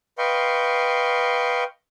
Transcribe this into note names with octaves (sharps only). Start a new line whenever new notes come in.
B4 D#5 F5 G5 C6 C#6